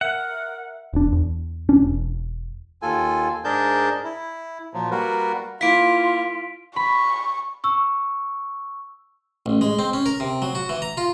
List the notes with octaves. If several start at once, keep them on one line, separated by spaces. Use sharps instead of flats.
A#4 E5 F#5
E1 D4
E2
A#1 C#4 D4
E1
D#2 F4 A4 G#5
G#2 D4 G#4 A#4 A5 G6
E4
A#2 F3 F#3
G3 A#3 F#4 A#4 B4
A#3 E4 F4 B6 D7
B5 C#6
C#6 E6
A1
G#3
C4
C#4
A#4
C3
F#3
F#4
E3
A#5
F4